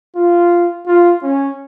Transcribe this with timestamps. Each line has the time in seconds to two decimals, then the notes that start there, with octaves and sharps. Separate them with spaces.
0.16 F4
0.87 F4
1.23 C#4